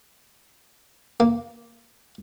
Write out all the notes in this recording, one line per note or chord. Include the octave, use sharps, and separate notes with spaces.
A#3